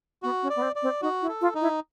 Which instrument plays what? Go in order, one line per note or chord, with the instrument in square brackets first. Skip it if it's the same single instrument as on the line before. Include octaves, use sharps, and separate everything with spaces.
[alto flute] B3 [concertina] F#4
[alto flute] C#4
[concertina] D5
[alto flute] B3
C4
[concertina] D5
[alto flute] C4
[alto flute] D#4 [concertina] F#4
[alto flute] E4
[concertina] A4
[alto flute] F4
[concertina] D#4
[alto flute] E4